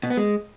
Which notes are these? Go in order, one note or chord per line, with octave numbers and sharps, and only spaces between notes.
B2
B3
G#3